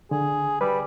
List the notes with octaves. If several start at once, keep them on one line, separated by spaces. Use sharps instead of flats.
D3 G#4
G3 B4